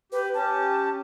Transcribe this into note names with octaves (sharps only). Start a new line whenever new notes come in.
G4 B4
C#4 G4 A5